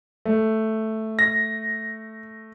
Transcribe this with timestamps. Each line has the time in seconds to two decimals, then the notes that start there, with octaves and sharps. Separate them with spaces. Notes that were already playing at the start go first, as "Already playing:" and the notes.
0.26 A3
1.19 A#6